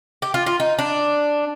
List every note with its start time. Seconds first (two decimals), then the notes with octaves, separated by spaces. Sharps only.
0.22 G4
0.34 F4
0.46 F4
0.60 D#4
0.79 D4